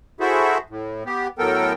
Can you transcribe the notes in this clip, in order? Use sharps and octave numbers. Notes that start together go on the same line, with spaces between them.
E4 F#4 G#4 A4 C5 E5
A2
B3 G4
A2 F#3 B3 A4 A#4 G5